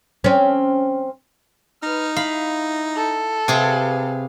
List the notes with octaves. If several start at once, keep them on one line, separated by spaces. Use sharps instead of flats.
C4 C#4
D#4 B4 F6
E4 F5 B5
A4
C3 G4 G#4 B4 F5